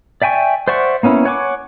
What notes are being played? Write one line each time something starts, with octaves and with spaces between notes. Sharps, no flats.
D5 E5 G5 G#5 C#6
C5 D5 E5 F#5 C#6
A#3 B3 C#4 E4
C#5 F#5 G#5 C#6 D6